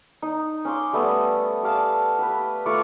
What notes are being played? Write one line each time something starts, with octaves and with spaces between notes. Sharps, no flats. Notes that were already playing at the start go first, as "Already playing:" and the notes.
D#4
C#4 F5 C6 D6
G3 A3 B3 D#5
G4 D5 F5 A5
G4 B4
A3 F4 C#6 D6